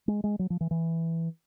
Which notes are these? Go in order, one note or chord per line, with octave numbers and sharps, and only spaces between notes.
G#3
G#3
F#3
F3
E3
E3